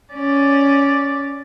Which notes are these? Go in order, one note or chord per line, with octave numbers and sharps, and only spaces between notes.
C#4 D5